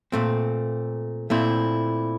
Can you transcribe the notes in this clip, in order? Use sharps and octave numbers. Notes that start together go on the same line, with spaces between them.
A#2 A3 C4
A#2 A3 C4 E4